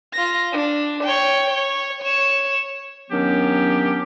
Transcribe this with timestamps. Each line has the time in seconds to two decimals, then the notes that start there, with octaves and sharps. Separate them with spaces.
0.13 F4 A#6
0.53 D4
1.03 C#5 G5
1.50 C#5
2.03 C#5 E7
3.11 D#3 F#3 B3 C#4 D4 G4